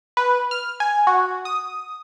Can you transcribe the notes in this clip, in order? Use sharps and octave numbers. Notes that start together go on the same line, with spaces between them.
B4
F6
G#5
F#4
D#6